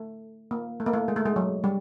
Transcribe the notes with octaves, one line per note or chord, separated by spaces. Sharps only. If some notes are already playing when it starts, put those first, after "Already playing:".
Already playing: A3
A#3
A3
A#3
A3
G#3
A3
G#3
F#3
G3